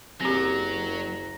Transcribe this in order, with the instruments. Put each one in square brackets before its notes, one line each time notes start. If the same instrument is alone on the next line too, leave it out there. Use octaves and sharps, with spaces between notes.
[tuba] F#1 [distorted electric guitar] F#3 [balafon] C4 G4 [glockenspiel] A#5 A#6